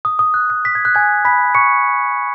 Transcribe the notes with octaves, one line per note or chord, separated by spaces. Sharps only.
D#6
D#6
F#6
F#6
B6
G#6
F#6
G#5 G#6
B5 B6
C#6 C#7